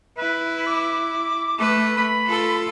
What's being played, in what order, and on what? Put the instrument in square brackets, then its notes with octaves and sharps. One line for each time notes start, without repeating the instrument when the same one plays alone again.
[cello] E4 [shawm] B4
[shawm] D6
[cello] A3 B4
[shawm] B5
[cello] F4 A4